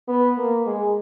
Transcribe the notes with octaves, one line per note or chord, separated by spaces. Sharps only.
B3
A#3
G#3